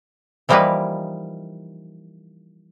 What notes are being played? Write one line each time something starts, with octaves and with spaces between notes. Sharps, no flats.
E3 F3 G3 A#3 D#4 B4